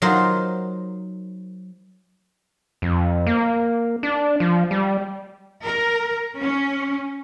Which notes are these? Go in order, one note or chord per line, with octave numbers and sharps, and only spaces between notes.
F#3 D#4 F4 A#4 C5
F2
A#3
D4
F3
G3
A#4
C#4